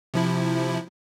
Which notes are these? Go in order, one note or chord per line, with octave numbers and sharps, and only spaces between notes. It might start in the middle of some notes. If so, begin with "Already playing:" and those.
C3 F3 E4